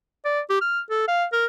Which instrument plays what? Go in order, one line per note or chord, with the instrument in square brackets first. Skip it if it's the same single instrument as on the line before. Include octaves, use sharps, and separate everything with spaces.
[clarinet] D5
G4
F6
A4
F5
A#4